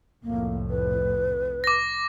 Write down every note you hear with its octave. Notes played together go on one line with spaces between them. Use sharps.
C2 F2 A2 A#3
B4
D6 A#6